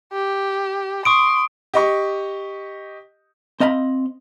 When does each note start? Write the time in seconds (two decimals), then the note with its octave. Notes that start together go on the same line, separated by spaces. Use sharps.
0.13 G4
1.05 C6 C#6 D#6 D7
1.74 G4 D#5 C#6
3.60 C4 D#5 F5 A5 B5